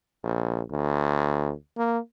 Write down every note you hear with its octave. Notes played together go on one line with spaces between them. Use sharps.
A#1
D2
A#3